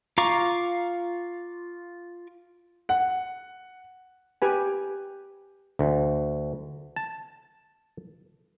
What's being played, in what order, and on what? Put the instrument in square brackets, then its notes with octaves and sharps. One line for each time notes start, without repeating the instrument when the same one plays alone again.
[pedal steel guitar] F4 F5 A#5 C#6 D6
[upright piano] F#5
[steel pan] G4 B4 G#5
[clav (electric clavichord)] D2
A5